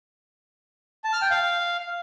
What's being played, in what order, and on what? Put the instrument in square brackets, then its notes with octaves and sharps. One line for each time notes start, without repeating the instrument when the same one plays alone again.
[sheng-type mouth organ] A5
F6
G5
F5